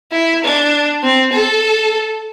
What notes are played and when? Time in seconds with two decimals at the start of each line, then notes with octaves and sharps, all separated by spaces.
0.12 E4
0.43 D4
1.03 C4
1.33 A4